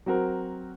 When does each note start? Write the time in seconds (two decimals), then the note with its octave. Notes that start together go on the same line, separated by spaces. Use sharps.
0.06 F#3 C4 F#4 A#4